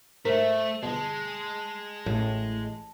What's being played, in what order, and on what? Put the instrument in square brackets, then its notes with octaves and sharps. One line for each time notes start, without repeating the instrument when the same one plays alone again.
[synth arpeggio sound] G#2 A#4 B6 [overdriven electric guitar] A3 [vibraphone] C5 E5
[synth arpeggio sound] G1 B2 [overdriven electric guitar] G#3 [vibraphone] A5
[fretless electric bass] A1 A2